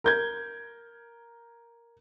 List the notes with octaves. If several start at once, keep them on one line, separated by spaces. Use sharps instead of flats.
A#4 G6 G#6